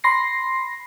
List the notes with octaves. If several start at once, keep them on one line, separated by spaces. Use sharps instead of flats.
B5 C6 A#6 C7